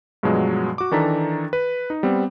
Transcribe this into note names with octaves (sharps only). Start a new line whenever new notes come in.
G2 B2 F3 F#3 G#3
F#4 D6
D#3 E3 D4 A4 A#5 B6
B4
D#4
G3 B3 C4